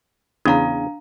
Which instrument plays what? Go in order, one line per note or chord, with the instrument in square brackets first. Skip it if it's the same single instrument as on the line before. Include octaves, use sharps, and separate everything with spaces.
[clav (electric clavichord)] E2 C#3 [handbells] D4 F5 A#5